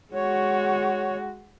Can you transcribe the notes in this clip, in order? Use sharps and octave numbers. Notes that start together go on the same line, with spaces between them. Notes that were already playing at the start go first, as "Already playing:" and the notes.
G#3 F#4 C#5